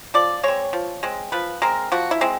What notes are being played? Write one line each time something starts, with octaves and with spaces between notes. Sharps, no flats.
F3 D5
G#3 C4 C#5
F3
G#3 C4
F3 B4
G#3 C4 A#4
F3 F#4
E4
G#3 C4